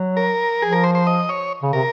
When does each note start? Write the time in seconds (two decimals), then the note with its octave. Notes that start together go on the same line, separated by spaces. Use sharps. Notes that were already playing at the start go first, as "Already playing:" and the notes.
Already playing: F#3
0.17 A#4
0.62 F3 G#4
0.73 A#4
0.84 C5
0.95 C5
1.07 D#5
1.29 C#5
1.62 C#3
1.73 C3 A#4